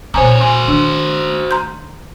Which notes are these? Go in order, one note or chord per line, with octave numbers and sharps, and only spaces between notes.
F2 A#2 C#3 C5 C#5 G#5 A#5
F#4 C5 G#5
D#3 A3 D4
A#5 C6 G6